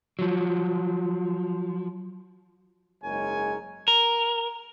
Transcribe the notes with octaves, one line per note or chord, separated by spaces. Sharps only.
F3 F#3
F#1 G#2 G#3 A#4 C#5 G#5
A#4